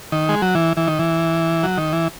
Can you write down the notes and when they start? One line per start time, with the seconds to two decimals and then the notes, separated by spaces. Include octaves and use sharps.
0.12 D#3
0.29 G#3
0.42 F#3
0.55 E3
0.77 E3
0.87 D#3
0.99 E3
1.63 F#3
1.77 D#3
1.93 E3